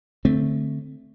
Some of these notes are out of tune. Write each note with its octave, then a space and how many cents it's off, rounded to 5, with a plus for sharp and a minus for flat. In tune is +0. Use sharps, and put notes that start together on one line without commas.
D3 +0 A3 +0 C4 +0